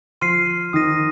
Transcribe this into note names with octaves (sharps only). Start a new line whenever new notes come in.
F3 C6 F6 C7 D#7
D#3 D#6 A#6 D#7